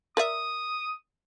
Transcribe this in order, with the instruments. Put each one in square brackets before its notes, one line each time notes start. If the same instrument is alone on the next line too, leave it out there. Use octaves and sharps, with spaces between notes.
[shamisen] A#4 D5 E5 [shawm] D#6